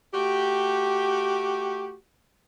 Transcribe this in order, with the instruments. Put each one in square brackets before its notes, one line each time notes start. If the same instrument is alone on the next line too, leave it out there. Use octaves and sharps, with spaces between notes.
[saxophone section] A3 F#4 G4